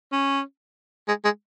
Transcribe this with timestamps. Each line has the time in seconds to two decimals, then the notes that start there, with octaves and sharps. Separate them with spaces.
0.12 C#4
1.08 G#3
1.24 G#3